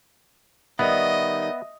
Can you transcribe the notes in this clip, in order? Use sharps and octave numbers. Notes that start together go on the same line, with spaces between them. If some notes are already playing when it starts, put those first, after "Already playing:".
D#3 G3 B3 D#5 E5